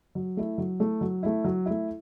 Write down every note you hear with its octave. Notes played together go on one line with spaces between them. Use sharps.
F#3
A3 E4
F#3
A3 E4
F#3
A3 E4
F#3
A3 E4